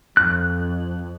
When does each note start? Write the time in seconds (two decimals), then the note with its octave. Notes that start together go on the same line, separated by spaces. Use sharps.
0.17 F2 F#6